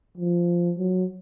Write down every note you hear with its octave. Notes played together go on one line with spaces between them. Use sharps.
F3
F#3